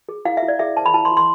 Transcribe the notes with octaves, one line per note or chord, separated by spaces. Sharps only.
G#4
E4 F5
E5
E4
D5
G#4 E5
C5 A5
B5
E4 A5
C6
E4
C6